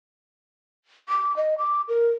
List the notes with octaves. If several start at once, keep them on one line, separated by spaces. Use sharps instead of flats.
D6
D#5
D6
A#4